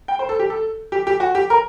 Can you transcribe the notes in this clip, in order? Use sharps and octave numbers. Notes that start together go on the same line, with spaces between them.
G5
C5
A4
G4
A4
G4
G4
F#4
G4
A#4